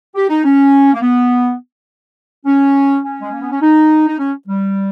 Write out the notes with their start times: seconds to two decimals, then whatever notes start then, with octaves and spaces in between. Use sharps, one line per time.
0.15 G4
0.29 D#4
0.44 C#4
0.93 A#3
1.02 B3
2.46 C#4
3.03 C#4
3.21 G#3
3.32 A#3
3.41 B3
3.51 C#4
3.61 D#4
4.08 D#4
4.18 C#4
4.48 G3